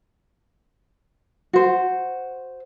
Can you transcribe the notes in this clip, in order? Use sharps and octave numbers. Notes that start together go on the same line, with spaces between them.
F#4 C5